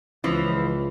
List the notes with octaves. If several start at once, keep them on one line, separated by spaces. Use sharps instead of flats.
C#2 E3 F3